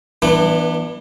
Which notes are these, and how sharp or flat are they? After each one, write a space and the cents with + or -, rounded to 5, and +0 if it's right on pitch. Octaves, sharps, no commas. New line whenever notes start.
E3 +0 B3 -30 D4 +25